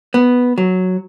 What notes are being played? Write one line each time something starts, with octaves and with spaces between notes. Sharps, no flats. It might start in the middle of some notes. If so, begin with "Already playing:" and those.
B3
F#3